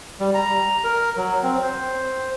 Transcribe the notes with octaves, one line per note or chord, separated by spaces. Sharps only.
G3
A#5
A#4
F#3
C4
C5